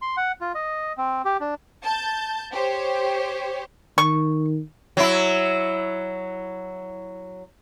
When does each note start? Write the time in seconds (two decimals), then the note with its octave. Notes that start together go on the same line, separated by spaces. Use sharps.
0.02 C6
0.17 F#5
0.41 F4
0.55 D#5
0.98 C4
1.25 G4
1.40 D4
1.84 A5 G6
2.51 G4 C5 C#5
3.98 D#3 C#6
4.97 F#3 E4